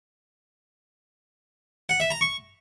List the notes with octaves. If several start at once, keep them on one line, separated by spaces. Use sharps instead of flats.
F#5
E5
A#5
C#6